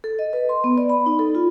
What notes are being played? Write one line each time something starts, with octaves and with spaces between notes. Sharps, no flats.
A4
D#5
B4
C6
B3
D5
B5
D#4
A4
F4